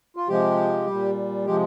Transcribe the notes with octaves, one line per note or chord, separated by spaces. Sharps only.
F4
C3 F3 G#3 G4
A#2 G3
C3 F3 G#3 G4